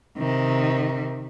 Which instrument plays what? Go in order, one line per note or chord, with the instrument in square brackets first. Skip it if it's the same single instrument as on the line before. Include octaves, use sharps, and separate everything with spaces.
[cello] C3 D#3